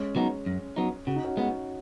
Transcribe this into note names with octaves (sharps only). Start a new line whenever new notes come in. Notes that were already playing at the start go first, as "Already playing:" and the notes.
Already playing: G#3 C#4
F#3 B3 D#4
F#2
F#3 B3 D#4
C#3 F#4
D#4
C#4 F#4
G#3 B3